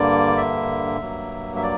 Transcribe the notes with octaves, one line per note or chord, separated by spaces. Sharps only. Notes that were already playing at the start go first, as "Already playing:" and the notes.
Already playing: G2 D3 A#3 D5
E5
G2 F#3 A#3
E5
D5